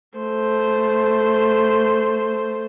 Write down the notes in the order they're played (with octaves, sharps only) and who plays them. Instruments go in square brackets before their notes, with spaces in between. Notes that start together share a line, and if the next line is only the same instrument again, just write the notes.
[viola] A3 C5